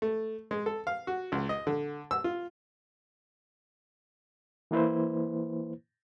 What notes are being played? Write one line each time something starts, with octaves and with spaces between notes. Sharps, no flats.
A3
G#3
A4
F5
F#4
C#2
D#5
D3
E6
F4
E3 A#3 E4 B4 C5